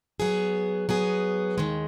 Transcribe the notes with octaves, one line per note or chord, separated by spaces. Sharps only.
F#3 B3 G#4
F#3 B3 G#4
D#2 D#3 G#3